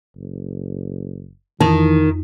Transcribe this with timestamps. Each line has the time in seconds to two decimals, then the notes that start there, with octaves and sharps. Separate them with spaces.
0.16 F#1
1.61 F2 D#3 E3 D#4